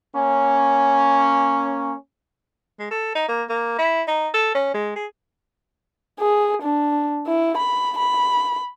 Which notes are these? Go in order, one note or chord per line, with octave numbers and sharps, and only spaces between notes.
A#3 C#4
G#3
A4
D#4
A#3
A#3
E4
D#4
A4
C#4
G#3
G#4
G#4
D4
E4
B5
B5